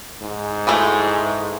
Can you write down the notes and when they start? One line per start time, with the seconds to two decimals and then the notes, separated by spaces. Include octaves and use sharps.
0.22 G#2
0.67 E3 G#3 A3